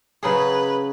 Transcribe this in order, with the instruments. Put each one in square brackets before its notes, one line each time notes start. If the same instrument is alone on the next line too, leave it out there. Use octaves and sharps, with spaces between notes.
[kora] C#3 F#3 G#4 [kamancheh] B4